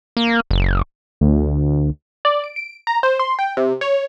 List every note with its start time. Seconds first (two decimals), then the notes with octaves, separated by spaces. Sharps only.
0.17 A#3
0.51 F#1
1.21 D2
2.25 D5
2.44 D7
2.56 D7
2.87 A#5
3.03 C5
3.19 C6
3.39 G5
3.57 C3
3.81 C#5